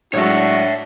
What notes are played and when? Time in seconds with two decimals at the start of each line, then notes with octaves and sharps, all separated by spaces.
0.14 A2 F#3 G#3 D4 F#4 C#5 E5